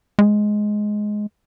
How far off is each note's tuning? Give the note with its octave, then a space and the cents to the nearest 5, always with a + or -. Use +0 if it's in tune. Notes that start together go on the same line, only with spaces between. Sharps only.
G#3 +10